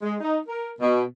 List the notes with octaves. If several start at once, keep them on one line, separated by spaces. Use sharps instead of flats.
G#3
D#4
A#4
B2